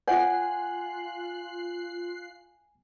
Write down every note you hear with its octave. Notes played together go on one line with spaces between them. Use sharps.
F4 C#5 F#5 G#5 F#6 C7